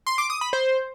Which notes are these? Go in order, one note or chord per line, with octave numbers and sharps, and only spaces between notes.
C6
D6
D#6
B5
C5